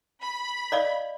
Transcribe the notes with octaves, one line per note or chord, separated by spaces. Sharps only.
B5
D5 D#5 F5